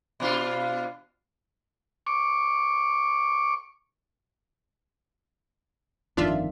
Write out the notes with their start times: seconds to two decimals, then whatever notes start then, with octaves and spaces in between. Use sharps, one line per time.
0.20 B2 D4 F4
2.07 C#6 D6
6.17 G1 F2 D#3 D4 F4 E5